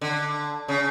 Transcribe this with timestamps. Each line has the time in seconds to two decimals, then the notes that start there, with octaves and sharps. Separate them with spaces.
0.01 D3
0.68 C#3